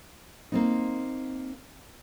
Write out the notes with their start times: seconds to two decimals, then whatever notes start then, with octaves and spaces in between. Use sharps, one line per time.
0.52 A#3 C4 D#4